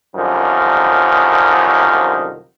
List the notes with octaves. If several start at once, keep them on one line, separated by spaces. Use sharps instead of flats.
C2 F#2 D3 D#3 F3